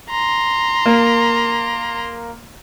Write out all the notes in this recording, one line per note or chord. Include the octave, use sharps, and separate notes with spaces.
A#5 C6
A#3